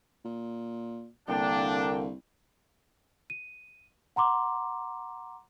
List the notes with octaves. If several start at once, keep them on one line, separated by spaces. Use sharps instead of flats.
A#2
C2 D3 A#3 D4 G5
D#7
F#5 A#5 C6 D6